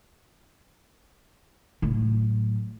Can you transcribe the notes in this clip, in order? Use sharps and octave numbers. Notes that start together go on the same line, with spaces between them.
A2 F#3